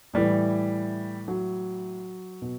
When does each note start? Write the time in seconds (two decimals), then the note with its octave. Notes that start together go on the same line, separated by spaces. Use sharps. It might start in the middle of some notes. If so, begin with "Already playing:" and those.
0.14 A2 E3 G3
1.28 F#3
2.42 B2